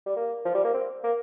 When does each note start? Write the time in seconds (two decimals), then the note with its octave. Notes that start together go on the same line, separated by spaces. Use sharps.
0.06 G3
0.16 A#3
0.45 F3
0.55 G3
0.64 A#3
0.74 C4
1.03 A#3